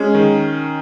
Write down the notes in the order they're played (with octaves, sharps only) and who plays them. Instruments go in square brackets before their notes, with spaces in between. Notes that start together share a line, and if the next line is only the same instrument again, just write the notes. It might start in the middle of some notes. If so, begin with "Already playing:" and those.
Already playing: [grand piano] G#3 [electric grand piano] C#4
[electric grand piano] D#3